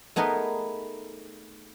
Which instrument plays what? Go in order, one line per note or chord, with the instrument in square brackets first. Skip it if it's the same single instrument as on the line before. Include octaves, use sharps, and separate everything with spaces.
[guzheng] A3 B3 D#4 G#4 A#4 B4